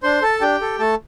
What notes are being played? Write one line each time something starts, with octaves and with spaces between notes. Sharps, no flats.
D4 C5 C6
A4 A5
D4 G4 G5
A4
A3 A4 A5